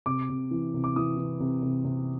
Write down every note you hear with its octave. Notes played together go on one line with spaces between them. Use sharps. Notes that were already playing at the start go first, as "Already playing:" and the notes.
C3 D6
C3
E3
C3
D6
E3 D#6
E3
C3
C3
C3